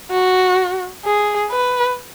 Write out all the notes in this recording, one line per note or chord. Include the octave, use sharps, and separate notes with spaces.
F#4
G#4
B4